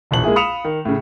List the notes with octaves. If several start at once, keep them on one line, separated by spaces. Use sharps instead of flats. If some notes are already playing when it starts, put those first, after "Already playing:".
E1 A#1 A5 F#7
G#3 A#3 E4 G#4
F5 B5 D#6 C#7 E7 F7
D#3
A2 C#3